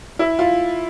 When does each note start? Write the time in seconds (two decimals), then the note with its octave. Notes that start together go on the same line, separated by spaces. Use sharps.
0.19 E4
0.39 F4